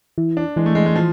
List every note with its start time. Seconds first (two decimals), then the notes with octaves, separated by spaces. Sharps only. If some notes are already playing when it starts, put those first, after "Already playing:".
0.18 E3
0.37 D4
0.56 E3 G#3
0.66 A3
0.75 G#3
0.86 G#3
0.95 F3